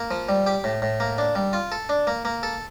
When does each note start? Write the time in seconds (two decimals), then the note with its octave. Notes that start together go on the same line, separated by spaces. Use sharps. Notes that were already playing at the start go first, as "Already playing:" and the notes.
Already playing: A#3
0.11 F3
0.29 G3
0.47 G4
0.64 A2
0.82 A2
1.00 A#3
1.18 D4
1.35 G3
1.53 F4
1.72 A4
1.89 D4
2.07 A#3
2.25 A#3
2.43 A4